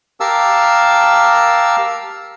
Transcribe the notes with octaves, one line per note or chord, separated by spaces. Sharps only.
G4 A#4 F5 A5 E6